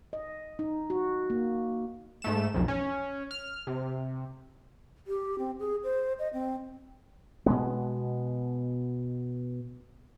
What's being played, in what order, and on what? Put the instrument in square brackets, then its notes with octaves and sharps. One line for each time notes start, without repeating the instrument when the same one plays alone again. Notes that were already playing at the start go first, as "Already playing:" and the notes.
[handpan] D#5
D#4
F#4
A#3
[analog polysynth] G#2 A3 E7
B1 F2
C#4
F6
C3
[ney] G4
C4
G#4
C5
D#5
C4
[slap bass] B2 G#3 B3